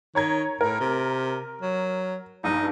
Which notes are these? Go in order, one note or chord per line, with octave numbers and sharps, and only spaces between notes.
D#3 C#5 A#5 G#6
A2 A#4
C3
F#3
A#1 G2 D#4